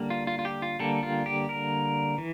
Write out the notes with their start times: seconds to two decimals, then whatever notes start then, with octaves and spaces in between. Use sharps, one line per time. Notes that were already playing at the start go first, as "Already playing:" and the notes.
Already playing: D3 G3 A#3
0.10 F4
0.27 F4
0.39 F4
0.45 G4
0.62 F4
0.80 D3 G3 A#3 A4
1.03 F4
1.26 G4
1.49 A#4
2.18 E3